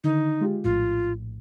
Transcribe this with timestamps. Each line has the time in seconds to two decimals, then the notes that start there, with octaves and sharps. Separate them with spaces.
0.04 D3 D#3 D#4
0.41 G#3 F4 G4
0.64 A#1 A2 F4